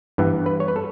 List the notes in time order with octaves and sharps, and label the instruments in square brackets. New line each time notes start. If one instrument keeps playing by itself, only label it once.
[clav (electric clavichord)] G2 E3 B3
B4
C#5
B4
A4